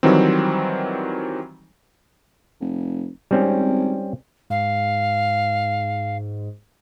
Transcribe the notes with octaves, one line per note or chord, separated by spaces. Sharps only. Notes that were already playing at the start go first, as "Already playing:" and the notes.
D#3 E3 F#3 G3 C4
F1
G#1 G3 C4 C#4
G#2 F5